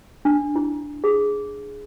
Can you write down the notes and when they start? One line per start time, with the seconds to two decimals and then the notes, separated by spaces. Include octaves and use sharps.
0.25 D4
0.56 E4
1.04 G#4